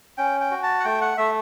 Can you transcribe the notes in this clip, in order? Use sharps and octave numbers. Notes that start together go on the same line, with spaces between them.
C#4 G5
G5
F#4
A5
F#5
A3 G5
F#5
A3 E5